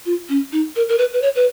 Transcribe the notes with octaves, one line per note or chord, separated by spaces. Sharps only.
F4
C#4
D#4
A#4
A#4
B4
B4
C#5
B4